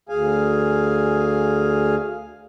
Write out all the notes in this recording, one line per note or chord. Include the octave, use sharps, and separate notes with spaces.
D2 G#4 F5 G#5